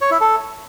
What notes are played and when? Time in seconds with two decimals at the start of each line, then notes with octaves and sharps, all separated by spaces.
0.01 C#5
0.11 E4
0.21 A4